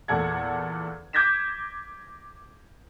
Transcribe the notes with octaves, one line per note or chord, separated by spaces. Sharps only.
E2 A#2 A4 F#5 G#6
D6 G6 G#6 A#6 B6 E7